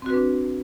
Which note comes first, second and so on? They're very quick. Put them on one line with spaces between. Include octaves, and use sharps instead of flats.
C4 F#4 B4 D4